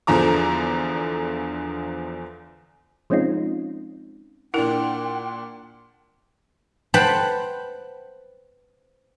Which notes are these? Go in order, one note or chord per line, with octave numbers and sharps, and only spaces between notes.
E2 D3 F3 A#5 D6
F3 G#3 C4 C#4 D#4 F4
A#2 D4 E4 A#4 F#5 G5
B4 C5 F#5 G5 A5 B5